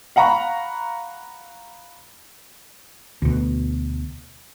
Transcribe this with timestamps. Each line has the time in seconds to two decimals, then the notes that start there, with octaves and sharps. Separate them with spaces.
0.16 F5 F#5 A#5 B5 C#6
3.22 D2 B2